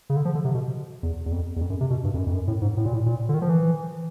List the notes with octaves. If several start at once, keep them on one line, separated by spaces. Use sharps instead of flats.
C#3
D3
F3
D3
C3
B2
E2
E2
F2
E2
F2
F#2
C3
B2
G2
F2
F#2
F2
F#2
A2
G#2
A2
A#2
A2
A#2
D3
D#3
F3
E3